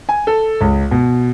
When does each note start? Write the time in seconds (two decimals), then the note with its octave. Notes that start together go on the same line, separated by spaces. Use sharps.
0.09 G#5
0.27 A4
0.61 C#2
0.91 B2